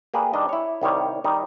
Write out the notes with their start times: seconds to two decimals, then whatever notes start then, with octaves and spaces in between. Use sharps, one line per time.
0.14 A#3 G4 G#4 B4 D5
0.34 D#3 G3 D4 D#5
0.49 E4 C#5
0.81 C2 D#3 G3 C#5
1.24 D#3 G3 D#4